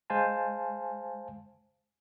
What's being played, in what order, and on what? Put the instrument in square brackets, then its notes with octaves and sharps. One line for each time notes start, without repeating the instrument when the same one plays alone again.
[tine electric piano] G#3 C5 F5 G#5 A5